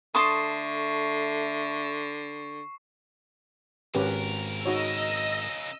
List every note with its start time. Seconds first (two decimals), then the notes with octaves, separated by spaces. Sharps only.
0.15 D3 A3 A5 C6 C#6 D#6 C7
3.95 G#1 C#3 C#4 G4 A#4 B4
4.65 D#4 F#4 C#5 D#5 E6